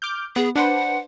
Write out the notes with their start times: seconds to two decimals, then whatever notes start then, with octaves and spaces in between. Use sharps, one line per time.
0.02 D6 F6 G6
0.36 B3 G#4
0.55 D4 B4 C5 F#5